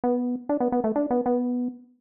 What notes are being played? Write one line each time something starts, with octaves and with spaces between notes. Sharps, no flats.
B3
D4
B3
B3
A3
D4
B3
B3